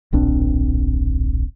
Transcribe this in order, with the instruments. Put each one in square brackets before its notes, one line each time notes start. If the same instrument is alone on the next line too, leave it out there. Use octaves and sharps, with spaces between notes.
[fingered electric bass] D1 A#1 C4 D4